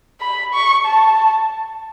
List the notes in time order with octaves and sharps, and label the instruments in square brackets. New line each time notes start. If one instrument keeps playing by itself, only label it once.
[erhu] B5
C#6
A5